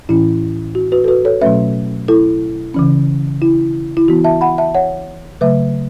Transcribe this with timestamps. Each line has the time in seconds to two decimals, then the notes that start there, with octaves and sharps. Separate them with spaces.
0.09 A2 E3 C#4 E4
0.75 F#4
0.92 F#4 B4
1.04 A4
1.08 F#4 B4
1.25 A4 C#5
1.41 B2 F#3 A3 C#4 B4 E5
2.08 E4 A4
2.74 C#3 E3 C#4
3.42 E4
3.97 E4
4.08 E3 B3 F#4
4.24 E5 A5
4.41 F#5 B5
4.58 E5 A5
4.74 C#5 F#5
5.41 C#3 F#3 A3 B4 E5